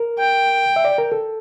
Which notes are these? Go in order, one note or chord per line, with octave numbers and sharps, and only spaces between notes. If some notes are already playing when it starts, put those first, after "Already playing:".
Already playing: A#4
G5
E5
D5
A#4
A4